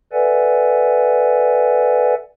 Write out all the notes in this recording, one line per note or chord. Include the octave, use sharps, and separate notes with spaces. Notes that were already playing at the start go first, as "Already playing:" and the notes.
A4 B4 D5 E5 F#5 G#5